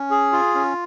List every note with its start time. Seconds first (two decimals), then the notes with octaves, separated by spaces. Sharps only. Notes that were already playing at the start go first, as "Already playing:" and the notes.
Already playing: C#4
0.11 G#4
0.32 F4
0.55 C#4